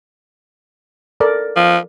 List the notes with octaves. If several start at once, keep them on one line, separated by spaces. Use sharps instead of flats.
A4 A#4 D5
F3